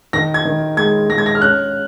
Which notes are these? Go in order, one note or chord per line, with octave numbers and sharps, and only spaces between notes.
D#3 A#6
G#6
D#3
G#3 G#6
G#3 A#6
G#6
A#6
F6
C#4 F#6